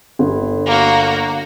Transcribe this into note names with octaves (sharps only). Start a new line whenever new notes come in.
G1
A#3 F#4